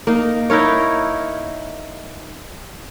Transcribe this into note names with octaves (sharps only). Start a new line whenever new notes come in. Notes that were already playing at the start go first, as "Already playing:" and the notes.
A#3 D#4
D#4 E4 A#4 C#5